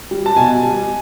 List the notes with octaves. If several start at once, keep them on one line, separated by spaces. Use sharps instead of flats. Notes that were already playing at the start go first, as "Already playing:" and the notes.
G3
A5
B2 G#5
G3